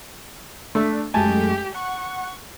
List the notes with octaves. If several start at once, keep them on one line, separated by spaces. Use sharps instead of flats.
A3 D4 E5
F#2 G#3 A3 G4 G#5 A5
F#5 C#6